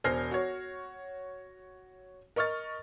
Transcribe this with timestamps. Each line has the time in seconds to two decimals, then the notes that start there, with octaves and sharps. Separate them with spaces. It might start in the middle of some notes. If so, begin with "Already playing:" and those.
0.04 E1 C5 G#5 F6 A#6 C7
0.31 F#4 C#5
2.36 A#4 D#5 C#6 F6 A6